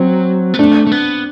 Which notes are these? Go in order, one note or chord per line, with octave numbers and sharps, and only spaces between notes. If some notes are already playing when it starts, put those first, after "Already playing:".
Already playing: F#3 C4
B3
A3 D4
A3
B3